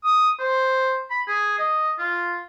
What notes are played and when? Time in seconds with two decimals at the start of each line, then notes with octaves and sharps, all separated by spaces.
0.04 D#6
0.39 C5
1.10 B5
1.28 G#4
1.58 D#5
1.98 F4